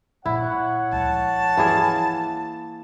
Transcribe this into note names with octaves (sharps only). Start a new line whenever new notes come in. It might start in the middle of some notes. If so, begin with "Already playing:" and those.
A#2 E4 C#5 F#5
D2 F3 A5
E3 A#3 G#4